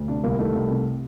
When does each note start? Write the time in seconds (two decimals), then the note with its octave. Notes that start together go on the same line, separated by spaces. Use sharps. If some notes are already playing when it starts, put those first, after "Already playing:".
Already playing: D2
0.08 C3 D4
0.23 C2 A#3
0.39 D#3 A3
0.55 C2
0.70 C3